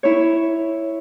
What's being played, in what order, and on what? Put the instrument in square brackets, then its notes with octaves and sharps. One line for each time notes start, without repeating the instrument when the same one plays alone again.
[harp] E4 C#5